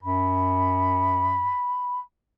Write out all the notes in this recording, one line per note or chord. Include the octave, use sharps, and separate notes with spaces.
F#2 B5